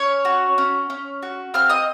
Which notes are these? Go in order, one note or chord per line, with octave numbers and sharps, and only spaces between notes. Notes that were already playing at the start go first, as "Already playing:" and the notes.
Already playing: C#4 C#5 C#6
F#4
C#4
C#4
F#4
C4 F5 F6
D#5 D#6